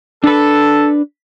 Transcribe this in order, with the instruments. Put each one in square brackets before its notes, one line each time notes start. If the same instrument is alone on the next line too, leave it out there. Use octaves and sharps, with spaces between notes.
[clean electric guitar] D4 B4 [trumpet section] A4